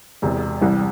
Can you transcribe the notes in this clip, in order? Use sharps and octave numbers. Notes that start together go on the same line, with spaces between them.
E1 E2 C3
C2 C3 E3 G3